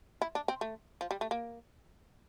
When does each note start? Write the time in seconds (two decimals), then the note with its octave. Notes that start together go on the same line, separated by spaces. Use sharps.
0.22 E4
0.35 D4
0.48 C4
0.61 A3
1.01 F3
1.11 G3
1.21 A3
1.31 A#3